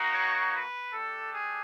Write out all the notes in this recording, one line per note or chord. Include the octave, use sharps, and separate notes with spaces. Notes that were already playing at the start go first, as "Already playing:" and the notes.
Already playing: A#3 D#4 F#4
C#5
B4
A3 D4 G4 A4
G#4